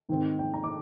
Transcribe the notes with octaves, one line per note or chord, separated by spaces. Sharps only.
G#2 D#3 G#3 C4
G5
A#5
D6